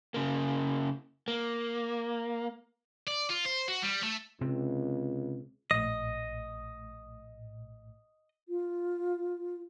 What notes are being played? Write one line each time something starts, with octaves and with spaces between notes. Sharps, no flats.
C#3 A#3
A#3
D5
F4
C5
F#4
G3
A3
C#2 C3 C4
A#1 A2 D#5
F4